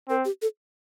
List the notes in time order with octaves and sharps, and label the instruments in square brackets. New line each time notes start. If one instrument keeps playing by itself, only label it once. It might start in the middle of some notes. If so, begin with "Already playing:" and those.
[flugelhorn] C4 [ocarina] A#4
[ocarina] G4
A4